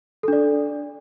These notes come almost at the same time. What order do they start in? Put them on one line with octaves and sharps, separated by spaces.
A4 D4 D5